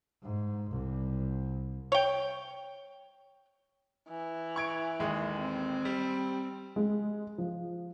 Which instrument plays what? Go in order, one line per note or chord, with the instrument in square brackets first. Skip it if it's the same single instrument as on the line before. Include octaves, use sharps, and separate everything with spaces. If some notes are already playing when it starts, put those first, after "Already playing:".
[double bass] G#2
C2
[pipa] C#5 G5
[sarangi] E3
[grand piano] C#6 G#6 D7
A1 D#2 G#3
[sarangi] C4
[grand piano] G3
[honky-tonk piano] G#3
F3